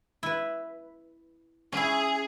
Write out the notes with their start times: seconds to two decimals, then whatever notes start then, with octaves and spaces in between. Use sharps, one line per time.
0.23 E4 B4
1.72 C#4 E4 G#4